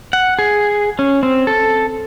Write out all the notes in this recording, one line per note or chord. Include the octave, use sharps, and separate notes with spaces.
F#5
G#4
C#4
C4
A4